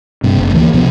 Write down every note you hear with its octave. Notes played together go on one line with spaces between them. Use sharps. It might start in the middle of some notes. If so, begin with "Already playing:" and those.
G2 C3
F#1
D2 E3 F#3 A#3
C#2 C3 F3 B3